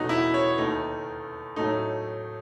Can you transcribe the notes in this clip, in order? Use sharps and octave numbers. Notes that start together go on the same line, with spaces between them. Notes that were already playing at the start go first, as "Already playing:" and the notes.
Already playing: E2 B2 F#3 A3 D#4 F#4
E4
C#5
D#2 D#3 A3 D#4
A2 F#3 A3 D#4